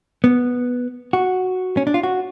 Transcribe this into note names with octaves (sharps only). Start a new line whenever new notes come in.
B3
F#4
C#4
D4
F4
F#4